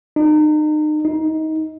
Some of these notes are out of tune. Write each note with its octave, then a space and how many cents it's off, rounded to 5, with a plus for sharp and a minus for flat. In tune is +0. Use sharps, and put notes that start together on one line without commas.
D#4 -35
D#4 +20